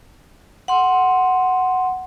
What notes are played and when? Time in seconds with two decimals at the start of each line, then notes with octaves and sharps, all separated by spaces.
0.68 F#5 C6